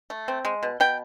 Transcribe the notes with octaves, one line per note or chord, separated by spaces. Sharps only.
A3
C4
G#3
B2
B2 G5